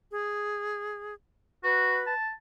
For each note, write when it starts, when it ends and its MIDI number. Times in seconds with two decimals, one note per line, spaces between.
0.11 1.14 68
1.64 2.00 66
1.64 2.14 71
2.07 2.30 81